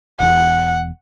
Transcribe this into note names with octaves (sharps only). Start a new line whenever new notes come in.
E1 E2 F#5